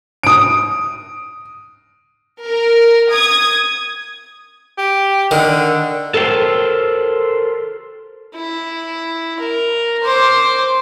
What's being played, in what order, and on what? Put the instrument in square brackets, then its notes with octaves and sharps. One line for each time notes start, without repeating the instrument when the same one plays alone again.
[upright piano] D#6 D7
[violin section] A#4
D#6 G#6
[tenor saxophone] G4
[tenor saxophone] D3 [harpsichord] D#3
[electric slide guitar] A4 A#4 C5 F5 G5
[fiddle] E4
A#4
C5 D6